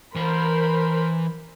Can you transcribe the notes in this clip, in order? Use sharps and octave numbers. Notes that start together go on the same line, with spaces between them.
E3 A#4 C5 B5 C6